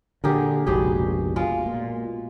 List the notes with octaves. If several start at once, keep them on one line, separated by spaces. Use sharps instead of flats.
A#2 D3 G4 G#4 A#4
F1 A#1 G#2 B2 G4 G#4
G#3 F4
A#2